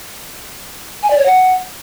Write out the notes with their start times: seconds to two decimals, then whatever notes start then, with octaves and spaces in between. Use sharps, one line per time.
1.03 G#5
1.10 D5
1.18 C#5
1.26 F#5